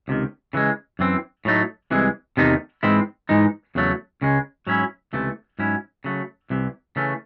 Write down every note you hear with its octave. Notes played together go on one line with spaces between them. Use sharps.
C#2 C3 D#3
C#3 E3 G#3
F#2 E3 C4
A2 F#3 A3 D#4
C2 C3 E3 G#3
E2 C3 D#3 A3 D#4
G#2 E3 G#3 C4 E4
G#2 E3 G#3 D#4
E2 C#3 F#3 A3
C#2 C#3 G#3
G#2 F#3 C#4 E4
C#2 C3 E3 A3
G#2 F#3 C#4 E4
C#3 F#3 A3
C2 C3 E3
C#3 E3 A3 C#4